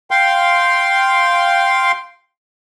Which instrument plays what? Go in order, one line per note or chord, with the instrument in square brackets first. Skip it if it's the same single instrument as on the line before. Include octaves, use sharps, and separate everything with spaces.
[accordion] F5 G5 C6